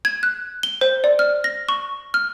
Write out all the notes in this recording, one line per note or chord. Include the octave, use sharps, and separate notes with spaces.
G#6
F#6
G7
C5
D5
F6
A#6
C#6
F6